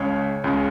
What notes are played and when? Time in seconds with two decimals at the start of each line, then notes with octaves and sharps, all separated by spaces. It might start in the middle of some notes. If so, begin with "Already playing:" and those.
Already playing: C#2 C#3 G#3 C#5
0.44 C#2 C#3 G#3